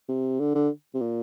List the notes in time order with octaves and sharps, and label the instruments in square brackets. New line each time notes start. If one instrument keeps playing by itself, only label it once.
[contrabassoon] C3
D3
D3
C3
A#2